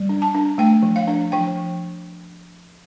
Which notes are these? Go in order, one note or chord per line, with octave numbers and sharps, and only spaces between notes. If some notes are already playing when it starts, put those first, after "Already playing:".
Already playing: G3
D4
A5
D4
A3 G5
F3
F5
D4
F3 G5